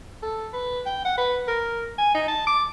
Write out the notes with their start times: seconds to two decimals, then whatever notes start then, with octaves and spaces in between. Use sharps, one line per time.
0.22 A4
0.54 B4
0.86 G5
1.05 F#5
1.18 B4
1.48 A#4
1.98 G#5
2.15 D#4
2.28 A5
2.47 D6